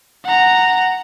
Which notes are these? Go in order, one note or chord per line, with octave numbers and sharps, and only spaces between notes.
F#5 A#5